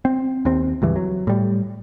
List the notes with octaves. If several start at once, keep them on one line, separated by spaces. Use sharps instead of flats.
C4
D#2 C4
C#2 G2 E3
F#3
A2 G3